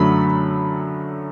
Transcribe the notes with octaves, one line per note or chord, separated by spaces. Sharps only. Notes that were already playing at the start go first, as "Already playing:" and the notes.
Already playing: F#2 D3 F#3 A3 B5